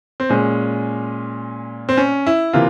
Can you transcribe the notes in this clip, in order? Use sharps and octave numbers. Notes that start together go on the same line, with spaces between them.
C4
A#2 G#3 C#4
C4
C#4
E4
C3 E3 A#3 F4